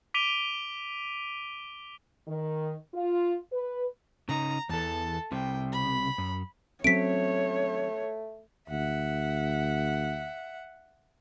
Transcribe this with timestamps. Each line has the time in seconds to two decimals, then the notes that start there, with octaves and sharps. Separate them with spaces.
0.14 D6 B6 D7 D#7 F7 G7
2.28 D#3
2.94 F4
3.52 B4
4.29 C#3 D#4 A#5
4.69 E2 E3 A4 A5
5.32 C2 C3 G5
5.72 B5
6.18 F#2
6.84 F#3 A3 C4 C#4 C#5 B6 D7
8.70 D2 E5 F#5